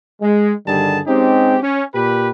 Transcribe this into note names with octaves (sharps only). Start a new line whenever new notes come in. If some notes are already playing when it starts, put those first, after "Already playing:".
G#3
G2 D3 D#3 G3 G#4 A5
G#3 C4 C#4 D#4 G4
C#4
A#2 G4 B4